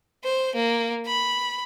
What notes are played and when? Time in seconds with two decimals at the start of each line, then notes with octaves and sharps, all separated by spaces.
0.24 C5
0.56 A#3
1.06 B5